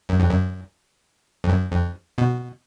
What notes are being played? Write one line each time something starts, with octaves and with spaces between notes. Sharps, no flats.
F#2
F2
F#2
F2
F#2
F2
B2